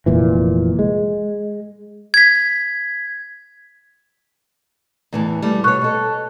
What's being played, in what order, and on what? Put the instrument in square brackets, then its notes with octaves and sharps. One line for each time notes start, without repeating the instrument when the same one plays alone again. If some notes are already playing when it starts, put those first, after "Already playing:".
[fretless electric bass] F1 A#2 E3
G#3
[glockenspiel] G#6 B6
[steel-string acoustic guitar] E2 A2 E3
G3 A3
[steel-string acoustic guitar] B2 C#5 [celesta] C#6 F#6
[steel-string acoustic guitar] B2 A4